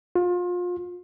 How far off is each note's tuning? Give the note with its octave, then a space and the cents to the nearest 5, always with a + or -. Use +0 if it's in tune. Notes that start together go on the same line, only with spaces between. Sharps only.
F4 +30